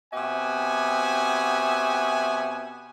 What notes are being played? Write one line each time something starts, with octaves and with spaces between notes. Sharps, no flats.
B2 C4 G4 E5 F#5 G#5